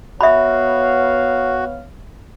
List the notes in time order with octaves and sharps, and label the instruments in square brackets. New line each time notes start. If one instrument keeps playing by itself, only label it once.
[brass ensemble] B3 C#5 F5 [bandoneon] F#4 [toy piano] E5 B5